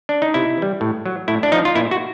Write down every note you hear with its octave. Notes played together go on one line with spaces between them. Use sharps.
D4
D#4
C3 E4
E3 G3
A2
F#3
A2 E4
D4
F3 D#4
F4
A#2 E4
F#4